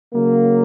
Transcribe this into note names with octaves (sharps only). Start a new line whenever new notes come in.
C#3 F#3 A#3